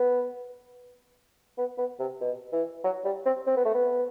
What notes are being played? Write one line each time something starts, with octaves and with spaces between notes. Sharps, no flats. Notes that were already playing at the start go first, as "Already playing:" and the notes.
Already playing: B3
B3
B3
C3
B2
E3
F#3
G3
C4
C4
B3
A3
B3